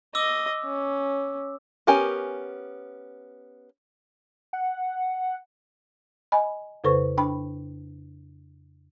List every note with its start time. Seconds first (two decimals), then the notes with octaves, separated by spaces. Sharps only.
0.15 D#5 D6 E6
0.65 C#4
1.87 B3 C#4 G4 A#4 G#5
4.53 F#5
6.32 D#5 G#5 B5
6.84 F2 C#3 A4 B4 C5 C#6
7.17 D4 G5 B5